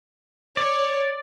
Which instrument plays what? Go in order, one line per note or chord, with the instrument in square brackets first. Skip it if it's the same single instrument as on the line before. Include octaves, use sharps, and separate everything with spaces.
[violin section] C#5 [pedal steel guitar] D5